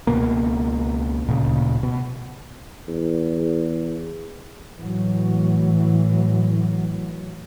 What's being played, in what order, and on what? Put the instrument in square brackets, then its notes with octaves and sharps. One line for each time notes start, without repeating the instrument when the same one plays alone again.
[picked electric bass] C#2 B2 A#3
D1 A#2 C#3
B2
[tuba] E2
[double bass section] A2 E3 F#3